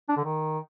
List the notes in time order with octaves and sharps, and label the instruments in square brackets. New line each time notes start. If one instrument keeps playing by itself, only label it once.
[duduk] D4
D3
D#3